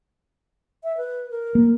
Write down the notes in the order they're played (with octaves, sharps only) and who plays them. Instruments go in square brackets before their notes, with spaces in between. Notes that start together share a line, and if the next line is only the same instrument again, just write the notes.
[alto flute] E5
B4
A#4
[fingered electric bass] A#3